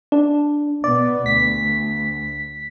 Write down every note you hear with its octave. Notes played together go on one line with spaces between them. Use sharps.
D4
B2 B3 D5
D2 B6